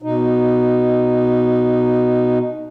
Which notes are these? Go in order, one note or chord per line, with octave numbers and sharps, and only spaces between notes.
B2 D#4